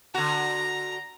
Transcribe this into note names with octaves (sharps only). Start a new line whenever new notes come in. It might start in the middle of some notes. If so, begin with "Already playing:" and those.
D3 F#4 A#5